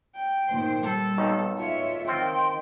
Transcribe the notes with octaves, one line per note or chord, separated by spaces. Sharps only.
G5
A#2 D#3 C5
G3 A4
B1 A#2 D#3
F4 C#5 E5
D#3 C4 F4 G5 C6